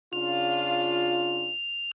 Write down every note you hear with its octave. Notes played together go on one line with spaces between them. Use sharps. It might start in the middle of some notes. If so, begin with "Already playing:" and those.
C#3 D4 F4 F6